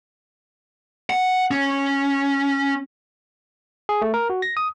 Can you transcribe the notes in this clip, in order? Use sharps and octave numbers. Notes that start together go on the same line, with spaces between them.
F#5
C#4
G#4
A3
A#4
F#4
A#6
D#6